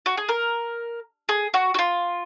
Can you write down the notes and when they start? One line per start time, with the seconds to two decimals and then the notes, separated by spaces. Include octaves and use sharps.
0.06 F#4
0.17 G#4
0.29 A#4
1.29 G#4
1.54 F#4
1.74 F#4
1.79 F4